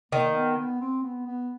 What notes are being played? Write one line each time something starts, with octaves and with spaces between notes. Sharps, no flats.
D#3 A#3
B3
B3
C4
B3
B3